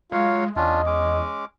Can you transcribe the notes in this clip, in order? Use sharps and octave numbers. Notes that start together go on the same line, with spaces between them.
F#3 G#3 F4 C#5 F5
E2 C#4 D4 F4 D#5
G#3 C#4 D6